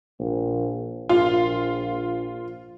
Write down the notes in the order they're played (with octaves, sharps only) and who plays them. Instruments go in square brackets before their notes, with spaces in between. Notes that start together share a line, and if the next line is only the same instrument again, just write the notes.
[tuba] A#1
[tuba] A#1 [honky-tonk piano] F4